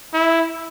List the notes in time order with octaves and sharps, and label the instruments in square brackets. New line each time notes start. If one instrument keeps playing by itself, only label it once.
[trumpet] E4